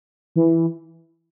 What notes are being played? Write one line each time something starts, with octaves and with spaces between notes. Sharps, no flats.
E3